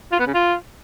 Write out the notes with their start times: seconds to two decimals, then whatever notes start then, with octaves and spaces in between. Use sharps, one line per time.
0.12 F4
0.19 B3
0.27 C#3
0.34 F4